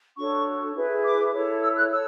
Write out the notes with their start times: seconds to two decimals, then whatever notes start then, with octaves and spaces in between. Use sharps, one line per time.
0.16 D4 F#4 A4 C#5 C#6
0.74 E4 G#4 B4
1.04 D6
1.33 E4 A4 C#5
1.62 E6
1.76 F#6
1.91 A4 C#5 E6